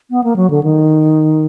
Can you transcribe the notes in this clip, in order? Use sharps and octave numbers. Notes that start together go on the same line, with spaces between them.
B3
A#3
F#3
D3
D#3